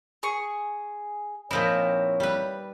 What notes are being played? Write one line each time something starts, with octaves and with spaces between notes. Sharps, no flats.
G#4 C#6
A#2 F3 C4 D#4 E4 C#5
G3 B4